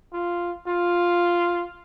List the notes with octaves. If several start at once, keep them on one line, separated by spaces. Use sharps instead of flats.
F4
F4